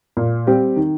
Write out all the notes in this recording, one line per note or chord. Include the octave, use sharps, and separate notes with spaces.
A#2
G3 C4 G4
D#3